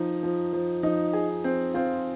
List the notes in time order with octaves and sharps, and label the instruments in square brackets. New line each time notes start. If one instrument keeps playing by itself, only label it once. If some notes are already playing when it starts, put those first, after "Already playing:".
Already playing: [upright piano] F3 D#4
F3
F3
[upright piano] F3 [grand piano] D#4
[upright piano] G#4
C4
[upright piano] C4 [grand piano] F4